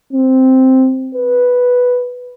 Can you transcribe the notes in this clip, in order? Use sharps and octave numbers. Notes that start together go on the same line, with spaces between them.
C4
B4